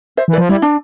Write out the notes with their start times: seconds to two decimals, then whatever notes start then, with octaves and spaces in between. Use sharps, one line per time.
0.17 C5 E5
0.28 E3
0.33 B4 D5
0.38 F3
0.49 G3 E4
0.62 D4